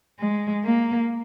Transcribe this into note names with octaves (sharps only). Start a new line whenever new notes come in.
G#3
A#3